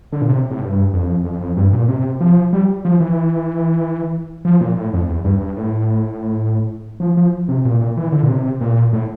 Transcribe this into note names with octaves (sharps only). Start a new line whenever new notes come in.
D3
A#2
C3
A2
G2
F2
F2
F2
G2
A#2
C3
F3
G3
F3
E3
F3
A#2
A2
F2
E2
G2
G2
A2
F3
F3
C3
A#2
A#2
E3
D3
A#2
C3
A#2
A2